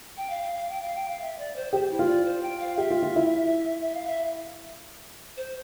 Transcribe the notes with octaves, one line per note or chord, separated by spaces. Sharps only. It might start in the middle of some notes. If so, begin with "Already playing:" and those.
G5
F5
F5
F5
G5
F5
G5
F5
E5
D5
C5
G4 C5
E4
F4
D5
C5
G5
F5
G4 E5
F4
F4
E4
E5
F5
E5
C5